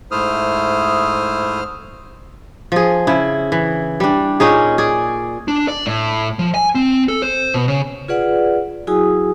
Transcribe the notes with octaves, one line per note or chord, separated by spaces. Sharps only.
G#2 A3 E4 C5 D#6 F6
F3 G#4
C#3 E4
E3
G3 D4
A#2 C#4 D#4 G#4
G#4 D5
D4
D5
A2
F3
G#5
C4
A4
C5
B2
C#3
F4 G#4 B4 D5 F#5
F#3 E4 F#4 G#4 G#5 D#6